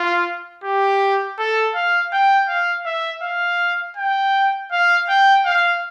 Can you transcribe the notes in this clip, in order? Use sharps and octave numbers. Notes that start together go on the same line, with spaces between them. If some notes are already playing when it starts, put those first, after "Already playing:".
Already playing: F4
G4
A4
F5
G5
F5
E5
F5
G5
F5
G5
F5